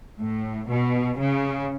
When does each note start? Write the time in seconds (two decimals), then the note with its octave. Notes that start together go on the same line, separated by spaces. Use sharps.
0.21 A2
0.70 B2
1.19 C#3